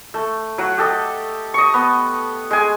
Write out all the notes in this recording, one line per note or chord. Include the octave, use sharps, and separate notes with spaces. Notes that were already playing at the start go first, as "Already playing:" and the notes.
A3
F#3 F#5
G4 A4 D#5
D#5 C#6
B3
G#3 G#5